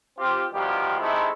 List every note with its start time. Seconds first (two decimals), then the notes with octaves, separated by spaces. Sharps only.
0.17 C4 F4 G4
0.52 G2 B2 D#3 F3 G3 G4
0.99 C3 G#3 A3 D#4 E4